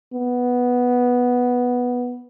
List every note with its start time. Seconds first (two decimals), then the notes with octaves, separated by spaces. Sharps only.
0.14 B3